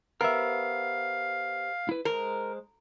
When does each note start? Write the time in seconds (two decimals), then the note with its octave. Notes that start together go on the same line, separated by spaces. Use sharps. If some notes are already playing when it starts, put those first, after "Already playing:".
0.21 B3 G4 A#4 C5 E5 F5 F6
1.89 E4 B4
2.05 G#3 A#4 C5